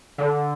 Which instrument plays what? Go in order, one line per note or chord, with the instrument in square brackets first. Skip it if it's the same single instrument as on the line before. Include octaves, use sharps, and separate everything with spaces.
[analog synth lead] D3